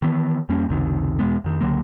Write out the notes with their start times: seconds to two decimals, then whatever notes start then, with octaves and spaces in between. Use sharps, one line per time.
0.02 D#3 E3 B3
0.49 F2 G3 A#3 C#4
0.69 F#1 C#2 C3 D#3
1.19 E2 B2 G#3 B3
1.44 F2 D#3
1.61 C#2 D3 F#3 A#3